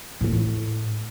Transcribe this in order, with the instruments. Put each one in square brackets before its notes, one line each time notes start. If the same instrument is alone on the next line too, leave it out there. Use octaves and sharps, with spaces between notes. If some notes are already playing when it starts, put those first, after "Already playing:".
[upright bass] A2 A3